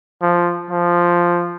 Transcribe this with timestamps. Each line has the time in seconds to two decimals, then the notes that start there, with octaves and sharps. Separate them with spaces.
0.22 F3
0.70 F3